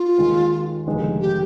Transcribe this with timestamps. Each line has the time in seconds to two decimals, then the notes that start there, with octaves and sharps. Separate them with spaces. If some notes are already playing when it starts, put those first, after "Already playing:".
Already playing: F4
0.18 D#2 D#3 G#3 D#4
0.86 F1 D#2 D3 G#3 D#4
1.20 G4